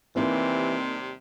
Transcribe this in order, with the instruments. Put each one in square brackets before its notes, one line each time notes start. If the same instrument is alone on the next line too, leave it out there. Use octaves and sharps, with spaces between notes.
[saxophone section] D#2 C3 G3 [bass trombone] E3 [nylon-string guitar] A#3 D#4 G4 [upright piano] C4